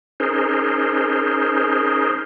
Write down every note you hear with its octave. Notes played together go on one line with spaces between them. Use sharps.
C#4 D#4 G#4 A#4 C5